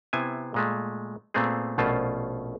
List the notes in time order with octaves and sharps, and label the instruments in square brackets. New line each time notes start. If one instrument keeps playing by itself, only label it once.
[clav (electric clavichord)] C3 B3 E4 C5 G#5
A#2 G#3 A3
A#2 A3 B3 C4 G#4
A#1 B2 A3 C#4 F4 C5